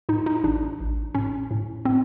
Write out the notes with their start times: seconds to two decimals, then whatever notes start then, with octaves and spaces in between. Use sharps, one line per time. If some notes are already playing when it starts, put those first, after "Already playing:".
0.09 A2 D#4
0.26 D#4
0.44 A1 D4
0.80 A1
1.15 A2 C#4
1.51 A2
1.85 A2 C4